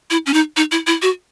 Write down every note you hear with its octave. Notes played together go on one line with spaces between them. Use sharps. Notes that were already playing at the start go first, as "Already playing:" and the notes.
E4
C#4
D#4
D#4
E4
E4
F#4